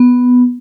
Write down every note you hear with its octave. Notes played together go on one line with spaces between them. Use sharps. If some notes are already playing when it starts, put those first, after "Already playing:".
Already playing: B3